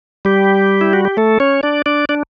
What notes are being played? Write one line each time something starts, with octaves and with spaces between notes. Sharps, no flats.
G3 G4
E4
F#4
G4
A3 A4
C#4 C#5
D4 D5
D4 D5
D4 D5